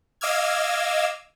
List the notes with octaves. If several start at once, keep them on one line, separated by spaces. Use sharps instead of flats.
D#5 F5 D6 E6 F6 G#6